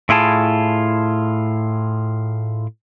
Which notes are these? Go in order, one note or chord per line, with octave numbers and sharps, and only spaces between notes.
A2 E4 F4 G#4 A5